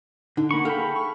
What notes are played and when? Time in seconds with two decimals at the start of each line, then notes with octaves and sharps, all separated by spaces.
0.37 D3 D#4
0.51 A#3 F#5 B5 C#6
0.65 A4 F5 G5 B5
0.77 G#4
0.95 C#6